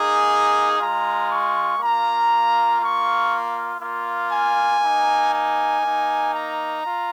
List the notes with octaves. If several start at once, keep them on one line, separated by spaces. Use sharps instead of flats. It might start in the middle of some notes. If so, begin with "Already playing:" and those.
Already playing: A#3 D#4 G#4
G#3 F4 A#5
C#6
A#3 F4 A#5
A#3 F4 C#6
A#3 F4
G#5
A#3 D#4
G#5
A#3 D#4
A#5
F4